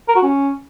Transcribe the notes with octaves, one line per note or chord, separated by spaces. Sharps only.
A#4
F#4
C#4